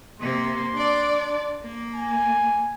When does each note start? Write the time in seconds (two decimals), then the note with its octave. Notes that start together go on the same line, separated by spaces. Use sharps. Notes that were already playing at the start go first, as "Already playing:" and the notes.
0.20 C3 A#3 C6
0.73 D4 D5
1.64 A#3
1.95 G#5